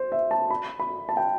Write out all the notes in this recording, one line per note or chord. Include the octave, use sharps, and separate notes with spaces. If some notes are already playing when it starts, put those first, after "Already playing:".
Already playing: C5
E5
A5
B5
B5
A5
G5